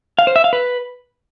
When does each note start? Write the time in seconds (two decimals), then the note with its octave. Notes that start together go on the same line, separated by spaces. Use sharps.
0.19 F5
0.27 C5
0.36 E5
0.44 F5
0.53 B4